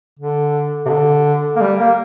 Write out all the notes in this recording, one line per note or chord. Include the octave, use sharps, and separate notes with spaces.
D3
C3
D3
A#3
G3
A#3